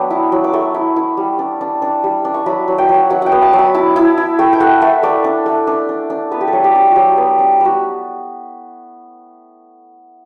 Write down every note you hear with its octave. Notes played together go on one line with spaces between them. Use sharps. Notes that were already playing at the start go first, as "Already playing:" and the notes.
Already playing: F#3 B3 D4 G5
E4
F#3
D6
A3 C#6
E4
E4
G3
D4
D4
D4
G3
D4
C#6
F#3 B5
F#3
G5
F#3
F#5
F#3 F#5
F#5 G5
B3
A5
F#3
B5
E4 A5
E4
E4
A3 G5
G5
A3 F#5
A3 E5
A3 D5
D4
A3
D4
D4
D4
B3 B4
G4
A4
F#3
G4
D4
F#3 F#4 G4
B3
D4
G3 F#4